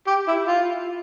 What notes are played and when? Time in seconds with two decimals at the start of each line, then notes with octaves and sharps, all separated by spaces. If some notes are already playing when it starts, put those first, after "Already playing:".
0.07 G4
0.27 E4
0.47 F4